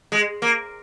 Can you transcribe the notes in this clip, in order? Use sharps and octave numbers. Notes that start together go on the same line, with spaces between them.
G#3
A#3